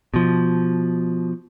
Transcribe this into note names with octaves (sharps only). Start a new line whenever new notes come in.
B2 F3